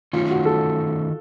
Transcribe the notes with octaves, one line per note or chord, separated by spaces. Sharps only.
D#3 A3 C#4 F4
F#4
A4